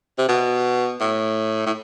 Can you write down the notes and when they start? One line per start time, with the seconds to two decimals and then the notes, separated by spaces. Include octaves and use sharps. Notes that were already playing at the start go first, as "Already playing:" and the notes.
0.18 C3
0.29 B2
1.01 A2
1.66 A2